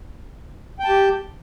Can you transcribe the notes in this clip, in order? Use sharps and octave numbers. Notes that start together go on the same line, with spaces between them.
G4 G5 A5